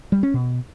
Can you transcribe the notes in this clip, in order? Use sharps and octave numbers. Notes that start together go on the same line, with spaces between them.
G3
C#4
B2